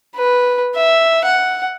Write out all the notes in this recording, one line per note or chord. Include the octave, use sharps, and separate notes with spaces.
B4
E5
F#5